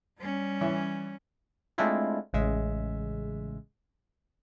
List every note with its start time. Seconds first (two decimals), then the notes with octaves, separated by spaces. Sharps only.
0.19 G3 C#4
0.61 E3 C#5 E5
1.78 G#3 A3 C4 D4 E4 F4
2.33 A1 C#3 G#3 E5